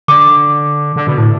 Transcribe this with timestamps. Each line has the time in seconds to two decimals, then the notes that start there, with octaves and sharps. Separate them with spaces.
0.08 D3 D6
0.96 D3
1.07 B2
1.18 A2